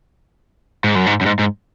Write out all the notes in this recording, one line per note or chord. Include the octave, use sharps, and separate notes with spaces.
G#2
F#2
G#2
F#2
G#2
G#2